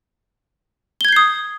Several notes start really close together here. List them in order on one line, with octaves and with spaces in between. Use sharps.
G7 G#6 G6 C7 D#6